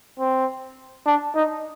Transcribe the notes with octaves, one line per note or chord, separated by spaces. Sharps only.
C4
D4
D#4